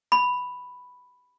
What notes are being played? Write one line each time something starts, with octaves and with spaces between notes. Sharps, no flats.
B5